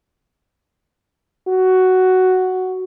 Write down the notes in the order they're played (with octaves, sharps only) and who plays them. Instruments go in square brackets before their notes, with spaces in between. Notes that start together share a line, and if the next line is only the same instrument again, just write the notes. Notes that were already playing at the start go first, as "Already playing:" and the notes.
[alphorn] F#4